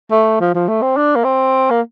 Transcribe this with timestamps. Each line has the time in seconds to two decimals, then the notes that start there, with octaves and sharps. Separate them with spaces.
0.11 A3
0.40 F3
0.55 F3
0.68 A3
0.82 C4
0.97 D4
1.15 A#3
1.24 C4
1.71 A#3